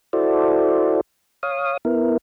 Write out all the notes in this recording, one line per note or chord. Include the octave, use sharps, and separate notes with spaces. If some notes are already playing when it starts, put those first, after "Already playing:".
E4 F#4 A4 C5 D5
C#5 F5 D#6
B3 E4 A#4